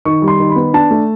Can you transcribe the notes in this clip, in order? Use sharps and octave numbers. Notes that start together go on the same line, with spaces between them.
D#3 C#6
G3
C6
D#3
B5
B3
D4 A5
A3